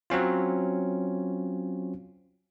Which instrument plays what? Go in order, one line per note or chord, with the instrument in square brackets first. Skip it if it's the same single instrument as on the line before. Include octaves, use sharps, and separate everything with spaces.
[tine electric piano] F#3 C4 C#4 F4